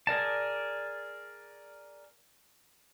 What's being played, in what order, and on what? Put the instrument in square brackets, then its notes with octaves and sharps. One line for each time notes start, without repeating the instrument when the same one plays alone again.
[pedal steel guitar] G#4 A#4 D5 A5